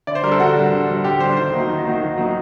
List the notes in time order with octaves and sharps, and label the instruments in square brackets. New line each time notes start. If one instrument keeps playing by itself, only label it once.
[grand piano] D3 D5
C5
G3 A#4
D4 A4
D3 F#4
G3 D4
D3
G3 D4
D3 G4
G3 D4 C5
D#3 C5
F#3 A#3 D#4
D#3
F#3 A#3 D#4
D#3
F#3 A#3 D#4